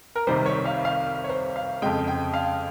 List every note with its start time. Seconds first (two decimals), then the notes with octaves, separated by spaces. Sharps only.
0.15 A#4
0.27 C2 C3 D#3 G3 C5
0.46 C#5
0.65 F5
0.85 F5
1.24 C#5
1.29 C5
1.56 F5
1.82 F2 C#3 G#3 G5
2.08 G5
2.33 F5